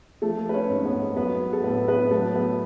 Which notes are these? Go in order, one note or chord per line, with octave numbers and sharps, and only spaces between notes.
F3 A3 A4
B4
C#4 C#5
G#2
B3 B4
F#3 B3 B4
A4
A2 B3 B4
B3 B4
F#3 A3 A4
B3 B4